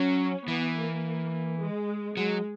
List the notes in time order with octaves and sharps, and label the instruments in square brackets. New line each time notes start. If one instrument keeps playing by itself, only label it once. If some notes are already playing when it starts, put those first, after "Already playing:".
Already playing: [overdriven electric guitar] F#3 [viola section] C#4
[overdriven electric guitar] E3 [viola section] B3
[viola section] A#3
G#3
[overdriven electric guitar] F#3 [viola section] G#3